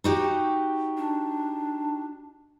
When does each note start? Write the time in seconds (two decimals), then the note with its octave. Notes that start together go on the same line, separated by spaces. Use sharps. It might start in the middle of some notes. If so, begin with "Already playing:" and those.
0.04 D#4 F#4 G4
0.97 D4